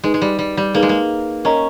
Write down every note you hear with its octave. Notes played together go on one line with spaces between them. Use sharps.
G#3 D#4 G#4 B4
G#3
G3
G3
G3
A#3 D#4 G#4 B4
G#3
A#3
C#4 A#4 D#5 A#5 C#6